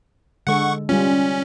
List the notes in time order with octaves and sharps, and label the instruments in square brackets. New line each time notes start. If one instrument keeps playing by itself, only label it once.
[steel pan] D3 G#3 A4 [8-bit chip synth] F#5 C#6
[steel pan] G3 F4 [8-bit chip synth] C#4